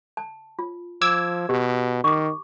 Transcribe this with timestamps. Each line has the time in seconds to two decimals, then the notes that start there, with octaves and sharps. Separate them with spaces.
0.17 A5
0.59 F4
1.02 F3 D6 E6 G#6
1.49 B2 G4
2.04 D#3 C#6 D6